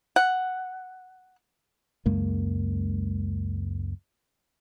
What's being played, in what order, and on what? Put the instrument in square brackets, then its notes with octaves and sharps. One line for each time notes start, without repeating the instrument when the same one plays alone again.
[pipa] F#5
[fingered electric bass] C#2 F#2 G#3 A#3